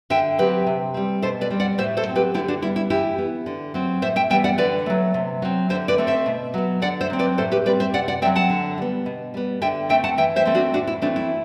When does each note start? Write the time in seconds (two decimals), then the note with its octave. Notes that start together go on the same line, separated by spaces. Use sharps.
0.10 D3 E5 G5
0.38 F#3 C4 G4 B4
0.67 C3
0.94 G3 C4
1.22 B2 A4 C5
1.41 B4 D5
1.50 G3 C4
1.60 D5 F#5
1.78 A2 C5 E5
1.97 A4 C5
2.06 F#3 C4
2.16 G4 B4
2.34 D3 E4 G4
2.48 D4 F#4
2.62 G3 B3 E4
2.76 E4
2.90 E3 E4 G4
3.18 B3
3.46 D3
3.74 F#3 C4
4.02 A2 C5 E5
4.16 E5 G5
4.30 E3 G3 B3 E5 G5
4.44 D5 F#5
4.58 D3 B4 D5
4.86 F#3 A3
5.14 C3
5.42 F#3 C4
5.69 D3 C5 E5
5.88 B4 D5
5.98 A3 C4
6.07 C5 E5
6.26 B2
6.54 F#3 B3
6.82 D3 D5 F#5
7.01 C5 E5
7.10 F#3 C4
7.19 B4 D5
7.38 A2 A4 C5
7.52 G4 B4
7.66 G3 C4 B4 D5
7.80 C5 E5
7.94 C3 D5 F#5
8.08 D5 F#5
8.22 F#3 A3 C4 E5 G5
8.36 F#5 A5
8.50 D3
8.78 G3 B3
9.06 B2
9.34 G3 B3
9.61 D3 E5 G5
9.89 A3 C4 E5 G5
10.04 F#5 A5
10.17 E3 E5 G5
10.36 C5 E5
10.45 A3 C4
10.54 D4 F#4
10.73 A2 D4 F#4
10.87 E4
11.02 E3 A3 C4 D4
11.16 E4